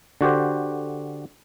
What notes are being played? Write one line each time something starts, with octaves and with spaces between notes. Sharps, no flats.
D3 F#4 G4 C5